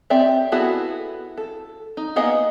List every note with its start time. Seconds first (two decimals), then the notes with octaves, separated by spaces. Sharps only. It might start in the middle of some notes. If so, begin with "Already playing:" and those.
0.10 C4 G4 D5 E5
0.52 B3 E4 F#4 G#4 A4
1.38 A4
1.97 D#4
2.16 A#3 B3 G#4 D#5 F#5